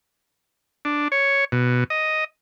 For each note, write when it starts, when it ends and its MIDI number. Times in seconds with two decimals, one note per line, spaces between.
0.85 1.08 62
1.12 1.45 73
1.52 1.84 47
1.90 2.24 75